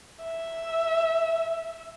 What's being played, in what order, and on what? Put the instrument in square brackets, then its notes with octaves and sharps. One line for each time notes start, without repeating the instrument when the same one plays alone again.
[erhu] E5